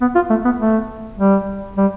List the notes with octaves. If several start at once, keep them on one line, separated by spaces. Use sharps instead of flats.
B3
F4
A3
B3
A3
G3
G3